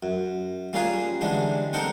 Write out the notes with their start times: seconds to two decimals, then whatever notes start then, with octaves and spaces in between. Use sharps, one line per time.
0.03 F#2
0.73 G3 A#3 C#4 F4 G#4 B4
1.21 D3 E3 G3 G#3 D4
1.73 C4 D4 D#4 A4 A#4 F#5